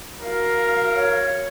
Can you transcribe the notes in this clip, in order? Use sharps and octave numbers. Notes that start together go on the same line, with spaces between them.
F#4 A#4 F5
C#5